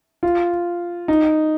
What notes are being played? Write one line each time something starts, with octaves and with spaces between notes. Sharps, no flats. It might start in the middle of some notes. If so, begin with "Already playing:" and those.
F4
D#4